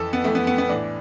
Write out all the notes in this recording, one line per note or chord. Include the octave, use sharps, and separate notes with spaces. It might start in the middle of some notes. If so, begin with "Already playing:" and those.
Already playing: F2 E3 A4
B3
F2 E3 A3
B3
B3
B3
A2 E3 D4